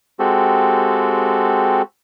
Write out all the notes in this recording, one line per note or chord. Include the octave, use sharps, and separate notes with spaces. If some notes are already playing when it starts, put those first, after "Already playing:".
G#3 C4 F#4 G4 A4